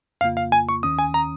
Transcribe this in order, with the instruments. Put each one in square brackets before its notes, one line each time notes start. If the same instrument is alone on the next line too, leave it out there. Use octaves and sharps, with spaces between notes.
[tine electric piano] F2 C#3 A#3 F4 [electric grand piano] F5
[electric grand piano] F5
G#5
C#6
[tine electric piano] D#2 D#3 C#4 [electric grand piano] D#6
[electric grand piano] G#5
A#5